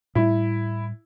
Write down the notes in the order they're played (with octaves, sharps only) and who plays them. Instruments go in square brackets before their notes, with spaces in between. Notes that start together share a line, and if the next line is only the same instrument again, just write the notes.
[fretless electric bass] A2 G3 [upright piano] E4